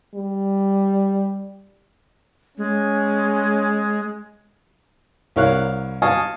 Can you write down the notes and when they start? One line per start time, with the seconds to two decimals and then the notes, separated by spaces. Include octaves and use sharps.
0.15 G3
2.58 G#3 C#4
5.36 C2 E4 A#4 C#5 F5 F#6
6.02 D#5 F5 G#5 A5 C#6 D#6